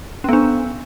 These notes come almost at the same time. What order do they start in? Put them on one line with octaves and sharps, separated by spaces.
C#4 B3 D4